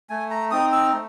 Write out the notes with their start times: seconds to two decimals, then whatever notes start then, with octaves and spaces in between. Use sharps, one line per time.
0.09 A3 G#5
0.30 A#5
0.51 C4 D#4 D#6
0.72 E6
0.93 A3